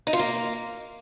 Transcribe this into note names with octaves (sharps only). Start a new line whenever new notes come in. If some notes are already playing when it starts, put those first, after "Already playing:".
D#4
F4
A#3